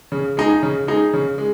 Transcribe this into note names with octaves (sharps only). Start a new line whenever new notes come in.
C#3
G#3 D#4 G#4
C#3
G#3 D#4 G#4
C#3
G#3